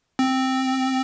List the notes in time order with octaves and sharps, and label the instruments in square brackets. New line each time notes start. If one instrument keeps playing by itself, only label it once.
[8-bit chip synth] C4